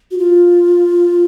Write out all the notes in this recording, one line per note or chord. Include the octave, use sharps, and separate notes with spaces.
F#4
F4